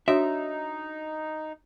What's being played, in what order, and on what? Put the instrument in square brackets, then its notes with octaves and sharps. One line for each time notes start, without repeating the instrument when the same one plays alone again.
[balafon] D4 F#4 C#5 [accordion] D#4 [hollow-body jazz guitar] E5